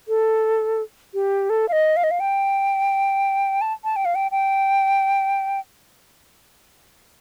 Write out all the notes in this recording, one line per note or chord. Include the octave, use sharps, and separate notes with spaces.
A4
G4
A4
F5
D#5
F5
D#5
F5
G5
A5
A5
G5
F5
G5
G5